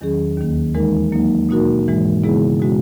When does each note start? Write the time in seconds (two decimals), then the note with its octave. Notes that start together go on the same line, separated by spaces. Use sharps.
0.01 E2 D#3 F#3 C#4 G#4
0.37 D#2 D#3 A#3
0.75 E3 G#3 D#4 A#4
1.12 F#3 A#3 D#4
1.49 B2 A#3 D#4 F#4 A#4
1.86 G#2 E3 G#3
2.23 C#3 G#3 B3 E4 G#4
2.60 B2 G#3 C#4 F#4